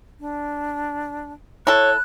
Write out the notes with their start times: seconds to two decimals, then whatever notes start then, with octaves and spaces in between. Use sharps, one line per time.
0.20 D4
1.67 E4 A4 C#5 F#6